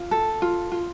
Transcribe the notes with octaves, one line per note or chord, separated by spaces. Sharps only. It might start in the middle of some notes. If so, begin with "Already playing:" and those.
Already playing: F4
A4
F4
F4